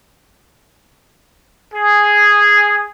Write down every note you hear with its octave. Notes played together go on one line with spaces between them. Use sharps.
G#4